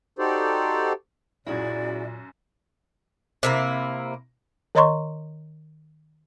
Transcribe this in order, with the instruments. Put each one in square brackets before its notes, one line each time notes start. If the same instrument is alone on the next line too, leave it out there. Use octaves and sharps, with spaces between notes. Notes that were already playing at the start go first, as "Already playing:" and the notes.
[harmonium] D#4 F#4 G4 A4 C5 D5
[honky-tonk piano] B1 F#2 [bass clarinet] A#2 [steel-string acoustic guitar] E4 F#4 G#4 [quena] D5
[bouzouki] C3 A#3 E4
[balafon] D#3 C#5 D#5 A#5 C6 C#6